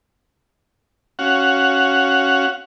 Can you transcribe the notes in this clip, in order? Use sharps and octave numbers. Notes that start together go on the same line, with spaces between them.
C#4 F#4 F5 F#5